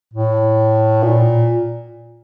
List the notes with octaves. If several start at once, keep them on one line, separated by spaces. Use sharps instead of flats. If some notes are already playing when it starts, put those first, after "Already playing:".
A2
A#2